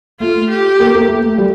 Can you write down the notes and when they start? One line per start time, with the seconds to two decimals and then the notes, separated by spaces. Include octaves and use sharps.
0.20 A3 F4
0.50 G4
0.80 A#3
0.95 A#3
1.08 A3
1.38 G3